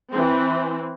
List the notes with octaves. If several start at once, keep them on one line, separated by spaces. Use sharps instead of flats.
E3 C4